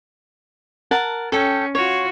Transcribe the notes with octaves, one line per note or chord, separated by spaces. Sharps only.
A#4 F#5 A5
C#4 A4 G5
F4 F#4 C#5